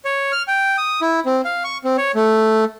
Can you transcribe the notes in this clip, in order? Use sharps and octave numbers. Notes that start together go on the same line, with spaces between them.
C#5
F6
G5
D#6
E4
C4
F5
C#6
C4
C#5
A3